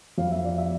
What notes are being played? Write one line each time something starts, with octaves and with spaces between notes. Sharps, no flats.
F2 F5
E5
D5
E5